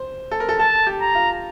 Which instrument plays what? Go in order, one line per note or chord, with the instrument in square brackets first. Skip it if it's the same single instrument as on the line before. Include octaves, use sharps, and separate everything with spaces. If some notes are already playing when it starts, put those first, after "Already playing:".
Already playing: [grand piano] C5
A4
A#4
A4
[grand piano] A4 [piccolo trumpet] A5
[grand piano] G4
[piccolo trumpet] A#5
[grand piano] F4